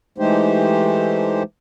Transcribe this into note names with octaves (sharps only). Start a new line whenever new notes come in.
E3 G#3 A3 D#4 G4 C5